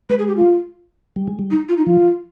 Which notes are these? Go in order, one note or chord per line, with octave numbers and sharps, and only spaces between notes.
G#3 B4
G#4
G4
F4
G3
G#3
G3
D#4
F4
D#4
F3 F4